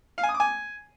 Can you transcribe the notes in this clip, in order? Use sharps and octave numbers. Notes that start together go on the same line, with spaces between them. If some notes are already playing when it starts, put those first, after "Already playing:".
F5
G#5
D#6
D6
G#5